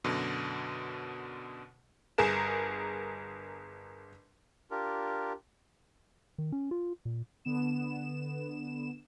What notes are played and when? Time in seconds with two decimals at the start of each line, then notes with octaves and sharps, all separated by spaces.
0.04 F#2 B2 D3
2.18 G1 G#4 A#4 E7
4.71 D4 F4 G4 A#4
6.38 D#3
6.52 C#4
6.71 F4
7.05 A#2
7.45 D3 B3 E7